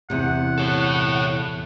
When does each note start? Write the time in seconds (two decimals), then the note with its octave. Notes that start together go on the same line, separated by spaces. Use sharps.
0.10 E2 C3 F#5
0.58 A4 C#5